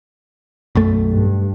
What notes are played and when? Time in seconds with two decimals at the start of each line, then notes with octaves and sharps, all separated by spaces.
0.75 B1 F#2 A3
1.11 G2